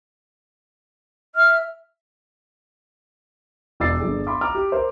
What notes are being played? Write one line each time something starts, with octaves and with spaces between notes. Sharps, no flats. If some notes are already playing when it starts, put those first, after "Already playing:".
E5 F6
E1 D5 D6 E6 A6 C7
G1 G#4
B5 C6 D6
A#5 D6 F6
G4
A#4 C5